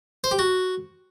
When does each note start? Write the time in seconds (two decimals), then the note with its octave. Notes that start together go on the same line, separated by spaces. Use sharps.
0.24 C5
0.31 G4
0.39 F#4